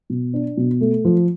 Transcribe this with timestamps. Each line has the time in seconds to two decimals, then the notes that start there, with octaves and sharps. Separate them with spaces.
0.10 B2
0.34 D4
0.57 B2
0.81 A3
1.05 F3